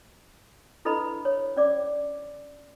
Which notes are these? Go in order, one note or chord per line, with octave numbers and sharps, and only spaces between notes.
D4 E4 A4 B4 D#5 B5
C#5
C#4 D5 D6